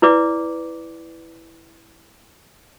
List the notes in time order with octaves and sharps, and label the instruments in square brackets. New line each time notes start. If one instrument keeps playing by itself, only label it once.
[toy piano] E4 B4 D5 D6